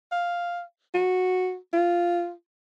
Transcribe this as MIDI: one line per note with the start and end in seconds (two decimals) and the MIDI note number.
0.12 0.62 77
0.94 1.56 66
1.73 2.31 65